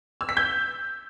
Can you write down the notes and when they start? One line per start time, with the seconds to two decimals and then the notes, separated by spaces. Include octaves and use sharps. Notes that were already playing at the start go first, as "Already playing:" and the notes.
0.21 E6
0.29 B6
0.37 G6